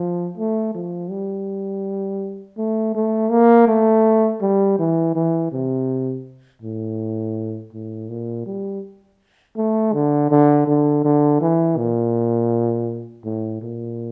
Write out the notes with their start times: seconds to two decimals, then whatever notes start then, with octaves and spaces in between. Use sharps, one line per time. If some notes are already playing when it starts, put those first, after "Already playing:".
Already playing: F3
0.38 A3
0.74 F3
1.10 G3
2.58 A3
2.95 A3
3.31 A#3
3.68 A3
4.42 G3
4.79 E3
5.16 E3
5.52 C3
6.62 A2
7.73 A2
8.09 A#2
8.46 G3
9.57 A3
9.93 D3
10.31 D3
10.67 D3
11.04 D3
11.41 E3
11.77 A#2
13.25 A2
13.62 A#2